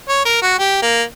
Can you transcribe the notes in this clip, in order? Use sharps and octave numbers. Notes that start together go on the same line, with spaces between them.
C#5
A#4
F#4
G4
A#3